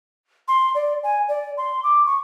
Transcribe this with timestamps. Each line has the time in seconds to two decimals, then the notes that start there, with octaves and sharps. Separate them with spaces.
0.48 C6
0.75 D5
1.04 G#5
1.29 D5
1.57 C6
1.83 D6
2.06 C#6